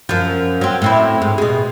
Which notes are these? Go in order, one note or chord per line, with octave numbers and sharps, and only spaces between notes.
F#2 F3
F#3 C4
A2 C4 E4
G#2
B2 G#3